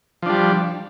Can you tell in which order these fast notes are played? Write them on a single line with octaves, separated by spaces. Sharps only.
F3 D4 G3